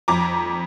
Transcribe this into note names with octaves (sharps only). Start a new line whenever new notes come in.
F2 A#5 D6